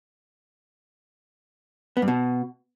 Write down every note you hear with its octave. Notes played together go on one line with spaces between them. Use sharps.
B3
G2
B2